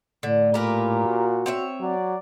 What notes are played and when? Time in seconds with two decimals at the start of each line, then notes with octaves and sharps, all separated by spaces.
0.23 A2 D3
0.54 A#2 G4 A#4 B4
1.05 F#4
1.46 C4 C#5 E5
1.81 F#3 D5